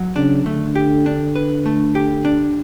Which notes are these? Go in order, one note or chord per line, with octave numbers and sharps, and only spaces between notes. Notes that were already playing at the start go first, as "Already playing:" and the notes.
Already playing: F#3
C#3 D4
D3 A3
G4
D4
B4
A3
G4
D4